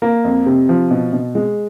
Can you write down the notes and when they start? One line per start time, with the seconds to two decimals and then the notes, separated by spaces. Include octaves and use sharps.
0.02 A#3
0.24 F2
0.46 C3
0.69 F3
0.91 B2
1.13 B2
1.35 G#3